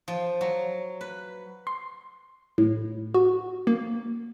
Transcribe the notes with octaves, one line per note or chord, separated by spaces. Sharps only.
F3
F#3
B4
C6
A2
F#4
A#3